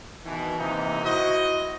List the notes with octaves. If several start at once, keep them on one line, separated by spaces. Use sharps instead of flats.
B2 D#3 E3
C3 E3 A#3 D#4
E4 F#4 C5 D#5